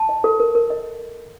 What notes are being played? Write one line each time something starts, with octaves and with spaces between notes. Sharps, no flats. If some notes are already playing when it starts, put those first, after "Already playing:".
Already playing: A5
D#5
A4
A#4
A#4
D#5